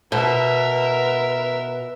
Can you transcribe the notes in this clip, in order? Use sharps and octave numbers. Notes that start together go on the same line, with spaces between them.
B2 A#4 B4 E5